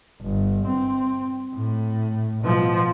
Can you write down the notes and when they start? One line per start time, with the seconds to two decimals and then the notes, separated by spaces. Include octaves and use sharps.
0.22 G1
0.66 C4
1.55 A2
2.42 B2 F3